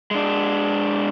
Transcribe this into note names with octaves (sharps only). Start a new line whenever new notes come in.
G#3 D4